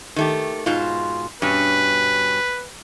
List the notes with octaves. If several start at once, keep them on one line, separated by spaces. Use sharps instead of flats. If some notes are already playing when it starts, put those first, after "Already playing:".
D#3 A3 G4
G#2 B2 F4
G2 B2 C#4 B4